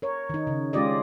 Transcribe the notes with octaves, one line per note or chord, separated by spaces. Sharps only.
A#4 C#5
D#3 D#4
C#3
G#3 C#4 F4 G4 D5 D#5